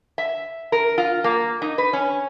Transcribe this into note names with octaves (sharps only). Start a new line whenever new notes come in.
E5
A#4
F4
A#3
D#4
B4
C#4